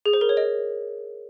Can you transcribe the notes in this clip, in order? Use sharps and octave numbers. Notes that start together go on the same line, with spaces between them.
G#4
C5
A#4
C#5
D#5